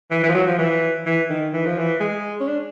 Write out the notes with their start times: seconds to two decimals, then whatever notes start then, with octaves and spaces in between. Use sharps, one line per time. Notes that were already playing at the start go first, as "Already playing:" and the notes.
0.11 E3
0.23 E3
0.29 F3
0.34 F#3
0.47 F3
0.58 E3
1.06 E3
1.30 D#3
1.53 E3
1.66 F3
1.78 E3
2.00 G#3
2.41 C#4
2.47 D4